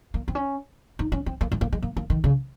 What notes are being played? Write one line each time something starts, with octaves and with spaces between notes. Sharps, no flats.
A#3
C4
C#4
D#4
C#4
C4
A#3
G#3
A#3
G#3
A#3
A#3
D#3
C#3